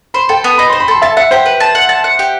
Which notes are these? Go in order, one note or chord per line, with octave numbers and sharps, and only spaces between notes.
C5 B5
A4 G5
B3
D#4 B5
C6
C5
B5
A4 C6
E5 A5
E5 F#5
G4 C5
B4
A5
F#5
A5
F#5
G4